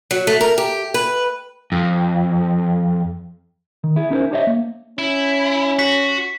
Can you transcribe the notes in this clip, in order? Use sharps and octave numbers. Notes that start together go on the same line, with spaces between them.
F#3
A3
A#4
G4
B4
F2
D#3
E4 G#4
C#4 D#4 E4 A4 A#4 C5
D4 G4 C5 C#5 D#5 E5
A#3
C#4 E4
F#4 B6